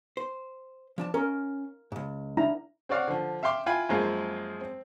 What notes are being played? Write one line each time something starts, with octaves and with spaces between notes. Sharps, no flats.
C5
F3 D4 A5
C#4 A#4
C#2 G#2
D4 E4 A#5
C4 F#4 C#5 D5 F5 F#5
D3 F3
E5 F5 G5 C6 D6
E4 F4 G5 G#5 B5
F#2 F3 G#3 A#3 F4 G#4
C4